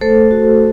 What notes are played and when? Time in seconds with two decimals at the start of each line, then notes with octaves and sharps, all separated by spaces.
0.01 A3 A4 C5
0.31 F#4